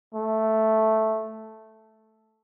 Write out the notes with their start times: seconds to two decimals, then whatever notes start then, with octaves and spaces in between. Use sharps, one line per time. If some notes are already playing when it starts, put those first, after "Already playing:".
0.15 A3